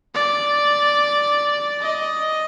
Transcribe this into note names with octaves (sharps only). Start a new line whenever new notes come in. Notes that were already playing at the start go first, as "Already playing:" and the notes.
D5
D#5